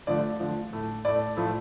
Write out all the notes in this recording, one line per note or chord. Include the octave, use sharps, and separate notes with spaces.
D3 F3 A3 D5
D3 F3 A3
A2 A3
A2 A3 D5
A2 F3 A3